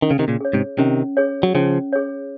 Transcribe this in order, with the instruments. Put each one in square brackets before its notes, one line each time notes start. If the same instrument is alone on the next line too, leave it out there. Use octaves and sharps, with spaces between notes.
[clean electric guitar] D#3 [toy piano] C#4
[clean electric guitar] C#3
C3 D#3
A#2 C#3
[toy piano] G#4 C#5
[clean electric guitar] G#2 C3
[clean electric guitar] C3 D#3 [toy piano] C#4
[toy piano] G#4 C#5
[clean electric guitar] F#3
[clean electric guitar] C#3 F3 [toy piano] C#4
[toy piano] G#4 C#5